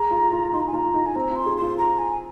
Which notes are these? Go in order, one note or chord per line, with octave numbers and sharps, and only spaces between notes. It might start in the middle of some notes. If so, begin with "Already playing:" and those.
Already playing: G#4 A#5
F4
F4
D#4 C6
A#5
G#5
F4 A#5
D#4
G#5
C4 A#5
F4 C6
G#4
F4 C6
A#5
G#5